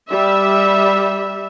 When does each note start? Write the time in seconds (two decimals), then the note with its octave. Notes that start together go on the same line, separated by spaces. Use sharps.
0.11 G3 E5